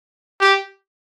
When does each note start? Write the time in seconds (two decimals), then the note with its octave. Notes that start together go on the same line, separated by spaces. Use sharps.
0.41 G4